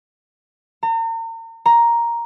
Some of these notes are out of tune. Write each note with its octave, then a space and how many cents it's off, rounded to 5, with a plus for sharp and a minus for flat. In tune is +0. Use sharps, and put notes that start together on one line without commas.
A#5 -40
A#5 +5